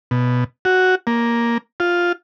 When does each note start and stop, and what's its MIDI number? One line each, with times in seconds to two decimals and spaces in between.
0.11 0.44 47
0.65 0.95 66
1.07 1.58 58
1.80 2.12 65